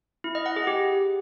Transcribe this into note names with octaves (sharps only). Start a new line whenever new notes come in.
E4
D#5
F#5
G#4
G4